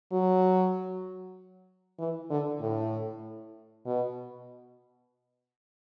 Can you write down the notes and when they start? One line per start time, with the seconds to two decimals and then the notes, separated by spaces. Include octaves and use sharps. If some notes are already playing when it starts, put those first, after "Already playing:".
0.12 F#3
1.99 E3
2.30 D3
2.61 A2
3.86 B2